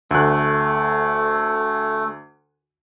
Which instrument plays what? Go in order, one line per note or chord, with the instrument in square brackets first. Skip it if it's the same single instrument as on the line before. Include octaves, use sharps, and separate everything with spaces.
[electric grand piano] D2 F#6 [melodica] A3